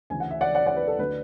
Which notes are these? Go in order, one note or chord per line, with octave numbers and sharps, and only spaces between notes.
D2 C#3 E3 G#5
F#5
E5
D5 F#5
D5 F#5
D5 F#5
B4
A4
D2 D3 B4